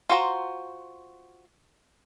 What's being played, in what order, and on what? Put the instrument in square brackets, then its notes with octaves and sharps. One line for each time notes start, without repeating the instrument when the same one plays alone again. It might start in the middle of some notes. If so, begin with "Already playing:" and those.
[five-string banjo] F4 F#4 C5 A#5